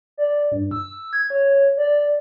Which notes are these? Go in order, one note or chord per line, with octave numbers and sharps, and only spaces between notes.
D5
G2
E6
G#6
C#5
D5